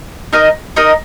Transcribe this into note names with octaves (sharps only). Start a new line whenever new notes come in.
D#4 A#4 D#5
D#4 A#4 D#5